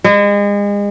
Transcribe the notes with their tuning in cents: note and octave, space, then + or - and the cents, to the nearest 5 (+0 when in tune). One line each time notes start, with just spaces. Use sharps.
G#3 -35